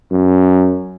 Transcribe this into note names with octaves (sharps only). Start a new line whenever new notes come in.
F#2